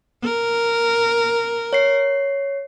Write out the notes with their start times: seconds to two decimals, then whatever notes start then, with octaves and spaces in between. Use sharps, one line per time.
0.24 A#4
1.73 C#5 C7